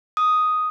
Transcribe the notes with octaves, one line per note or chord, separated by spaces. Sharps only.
D#6